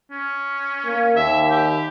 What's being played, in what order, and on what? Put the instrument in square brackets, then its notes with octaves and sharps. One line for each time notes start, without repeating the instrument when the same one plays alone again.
[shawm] C#4
[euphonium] A#3
[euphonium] D#2 [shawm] E5
[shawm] G4